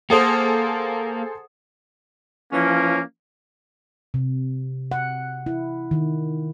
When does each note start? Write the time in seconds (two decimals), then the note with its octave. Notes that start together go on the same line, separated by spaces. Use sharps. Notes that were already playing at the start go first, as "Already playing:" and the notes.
0.10 A#3 G#4 A4 C5 F#5 D#6 C#7
2.53 E3 F3 A#3 C#4
4.14 C3
4.92 F#5
5.46 E4
5.91 D#3